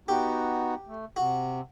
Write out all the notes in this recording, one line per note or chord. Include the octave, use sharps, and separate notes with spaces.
B3 D#4 F#4 G4
A3
C3 F#4